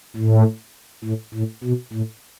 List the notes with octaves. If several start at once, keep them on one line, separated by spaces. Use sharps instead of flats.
A2
A2
A2
B2
A2